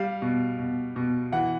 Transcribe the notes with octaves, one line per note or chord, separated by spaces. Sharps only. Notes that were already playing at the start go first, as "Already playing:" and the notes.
Already playing: G3 F5
B2
B2
B2
E3 F#5